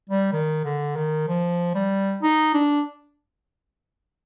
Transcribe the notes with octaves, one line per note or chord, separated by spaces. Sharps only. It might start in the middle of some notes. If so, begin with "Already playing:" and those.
G3
D#3
D3
D#3
F3
G3
D#4
D4